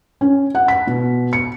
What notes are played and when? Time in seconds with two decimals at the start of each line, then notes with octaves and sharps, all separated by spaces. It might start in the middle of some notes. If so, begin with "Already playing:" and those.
0.21 C#4
0.55 F#5
0.68 B6
0.87 B2
1.33 C#7